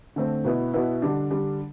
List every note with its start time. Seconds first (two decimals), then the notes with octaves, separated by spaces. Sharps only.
0.16 D3 A3 C4
0.44 B2 B3 E4
0.73 B2 B3 E4
1.02 D3 G3 D4
1.31 D3 G3 D4